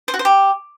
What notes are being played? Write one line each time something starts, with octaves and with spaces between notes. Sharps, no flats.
C5
F#4
C5
G4